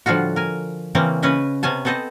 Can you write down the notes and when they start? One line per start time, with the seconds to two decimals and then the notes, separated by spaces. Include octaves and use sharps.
0.06 A2 D3 F3 G3 F4 F#4
0.36 A#4 G#5
0.95 C#3 E3 A#3 C4 C#4
1.22 C#3 C#4 B4 D#5 G#5
1.63 C3 B3 C#4 G#5 A5
1.85 B3 C4 A4 C5 D#5